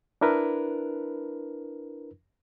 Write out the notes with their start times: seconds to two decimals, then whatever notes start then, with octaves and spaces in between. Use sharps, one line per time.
0.21 D4 E4 A#4 B4